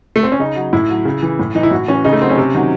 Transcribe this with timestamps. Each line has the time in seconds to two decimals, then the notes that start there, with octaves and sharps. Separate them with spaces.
0.16 A3
0.23 C4
0.32 C#4
0.39 C#3 D#4
0.56 F#3
0.73 A2 E4
0.89 F#3
1.05 C#3
1.23 E3
1.39 A2
1.55 E3 D#4
1.63 E4
1.71 A2 F#4
1.88 E3 C#4
2.04 C#3 D#4
2.13 A3
2.21 F#3 C4
2.29 C#4
2.37 C3
2.55 D#3 F#3